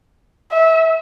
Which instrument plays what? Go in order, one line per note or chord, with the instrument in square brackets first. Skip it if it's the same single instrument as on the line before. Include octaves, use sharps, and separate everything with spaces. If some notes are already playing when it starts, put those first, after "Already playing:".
[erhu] E5